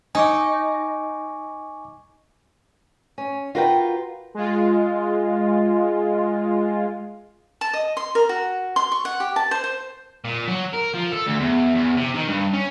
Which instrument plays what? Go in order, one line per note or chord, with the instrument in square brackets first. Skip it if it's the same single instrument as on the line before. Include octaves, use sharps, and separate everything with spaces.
[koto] D#4 [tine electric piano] G#5 C#6 D6
[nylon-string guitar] C#4
F4 F#4 A#4 B4 F#5 G5
[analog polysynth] G#3 F4
[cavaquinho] A5
D#5
C6
A#4
F#4
C6
C#6
F#5
G4
A5
C5
C5
[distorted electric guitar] A#2
F#3
A#4
F3
A4
D2
E2
E2
C3
D#3
G2
C#4